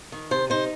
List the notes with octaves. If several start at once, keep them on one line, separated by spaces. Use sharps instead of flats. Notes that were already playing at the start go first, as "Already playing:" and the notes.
D#3
C3 C5
D#4 C5